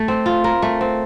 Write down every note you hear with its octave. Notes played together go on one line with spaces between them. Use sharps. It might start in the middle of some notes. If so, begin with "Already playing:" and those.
Already playing: A3
C4
F4
A#4
A3
C4